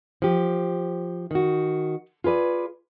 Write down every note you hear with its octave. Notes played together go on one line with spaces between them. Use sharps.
F3 G4
D#3 F#4
F4 G#4 B4 D5